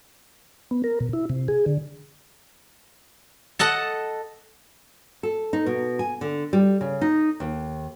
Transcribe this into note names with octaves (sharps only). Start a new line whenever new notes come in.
B3
A#4
B2
E4
C3
G#4
D3
A4 D#5 F#5 A5
A4
D#4
B2
G#5
D3
G3
C#3
D#4
D#2